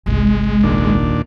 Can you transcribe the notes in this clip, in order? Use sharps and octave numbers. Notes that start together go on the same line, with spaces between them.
G1 C2 G#3
D#2 A#2 D4